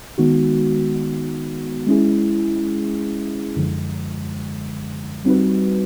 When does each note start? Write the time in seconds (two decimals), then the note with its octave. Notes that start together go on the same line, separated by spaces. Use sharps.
0.18 D#3 G#3 B3 D#4 F#4
1.87 G#3 C#4 E4 G#4
3.56 F#2 D3 F3 G#3
5.25 G3 C4 D#4 F#4 B4